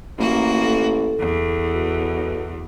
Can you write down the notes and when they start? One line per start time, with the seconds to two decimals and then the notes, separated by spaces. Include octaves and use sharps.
0.18 A1 A#3 F#4
0.64 A4
1.19 E2
1.75 B2